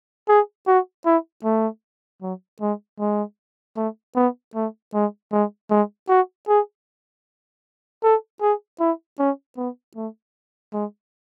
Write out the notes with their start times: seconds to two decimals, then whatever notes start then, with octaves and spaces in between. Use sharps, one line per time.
0.29 G#4
0.67 F#4
1.06 E4
1.45 A3
2.22 F#3
2.61 G#3
3.00 G#3
3.77 A3
4.16 B3
4.55 A3
4.94 G#3
5.32 G#3
5.70 G#3
6.09 F#4
6.48 G#4
8.04 A4
8.42 G#4
8.80 E4
9.19 C#4
9.57 B3
9.96 A3
10.73 G#3